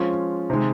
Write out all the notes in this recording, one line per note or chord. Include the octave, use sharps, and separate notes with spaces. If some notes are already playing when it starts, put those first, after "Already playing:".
Already playing: F3 G#3 C#4 F4 C5
C3 D#3 G#3